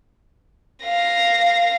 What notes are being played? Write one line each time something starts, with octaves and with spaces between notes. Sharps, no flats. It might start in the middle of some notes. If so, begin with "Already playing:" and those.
F5 A#6